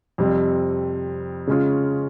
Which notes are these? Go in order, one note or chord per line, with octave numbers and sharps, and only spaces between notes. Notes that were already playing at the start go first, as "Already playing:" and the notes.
F2 C3 G3 C4
C#3 G#3 C#4 F4